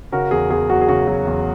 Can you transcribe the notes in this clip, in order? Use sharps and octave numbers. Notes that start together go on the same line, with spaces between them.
C#3 F#4 A#4
E2 G#4
E2 G#4
F#3 F#4
G#4
C#3 F#4
F#3
E2